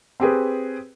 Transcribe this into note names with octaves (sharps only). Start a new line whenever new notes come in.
C4 G4 G#4 B4